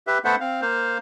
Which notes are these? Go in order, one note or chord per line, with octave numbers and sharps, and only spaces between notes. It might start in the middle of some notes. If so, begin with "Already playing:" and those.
G4 B4 E5
A3 B3 A4 C5 E5 F#5
C4 F5
A#3 C5 F5